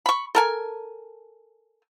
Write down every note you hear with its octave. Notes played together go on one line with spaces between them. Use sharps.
B5 C#6
A4 A#4 G#5